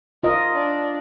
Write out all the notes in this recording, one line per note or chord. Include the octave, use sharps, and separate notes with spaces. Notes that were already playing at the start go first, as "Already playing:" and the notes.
F4 A#4 D#5
D4